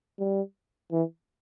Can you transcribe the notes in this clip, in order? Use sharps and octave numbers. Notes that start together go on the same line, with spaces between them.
G3
E3